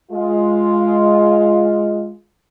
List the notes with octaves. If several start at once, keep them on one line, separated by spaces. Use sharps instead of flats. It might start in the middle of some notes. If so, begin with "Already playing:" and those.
G#3 F4